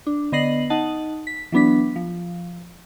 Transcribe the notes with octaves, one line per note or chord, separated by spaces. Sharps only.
D4
D3 B3 D#5 A#6 C7 F#7
D#4 D#5 F#5 A5
B6
E3 F#3 B3 D4 B6
F3